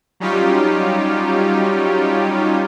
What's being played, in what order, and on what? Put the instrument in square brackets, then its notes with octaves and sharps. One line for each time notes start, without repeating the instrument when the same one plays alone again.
[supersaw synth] F#3 G3 C#4 D#4 F4 G4